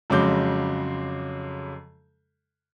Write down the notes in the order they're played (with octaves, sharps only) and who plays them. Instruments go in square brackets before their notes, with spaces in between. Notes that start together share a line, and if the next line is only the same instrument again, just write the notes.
[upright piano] F2 C#3 F#3 G#3 D6 G6